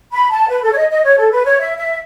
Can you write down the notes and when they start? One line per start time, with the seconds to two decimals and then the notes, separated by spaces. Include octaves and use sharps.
0.12 B5
0.30 A5
0.49 B4
0.63 A4
0.72 C#5
0.77 D#5
0.90 D#5
1.04 C#5
1.18 A4
1.31 B4
1.45 C#5
1.59 E5
1.78 E5